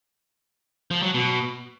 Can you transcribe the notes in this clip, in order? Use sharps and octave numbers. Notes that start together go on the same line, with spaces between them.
F3
F#3
B2